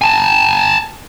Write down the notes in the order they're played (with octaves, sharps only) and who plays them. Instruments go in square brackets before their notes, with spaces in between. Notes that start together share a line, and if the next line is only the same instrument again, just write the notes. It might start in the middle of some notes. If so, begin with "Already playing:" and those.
[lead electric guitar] G#5 A5